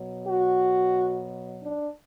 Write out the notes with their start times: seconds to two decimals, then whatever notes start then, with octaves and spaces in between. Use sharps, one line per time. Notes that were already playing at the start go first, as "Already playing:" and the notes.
Already playing: B2 F#3
0.27 F#4
1.64 D4